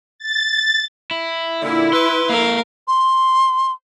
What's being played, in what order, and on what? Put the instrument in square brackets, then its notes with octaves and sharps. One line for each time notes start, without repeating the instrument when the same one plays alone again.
[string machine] A6
[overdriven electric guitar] E4
[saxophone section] A#2 D3 [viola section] E4
[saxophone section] B4 [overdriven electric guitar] C6
[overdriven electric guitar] A#3 A4 [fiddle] A#4 F5
[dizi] C6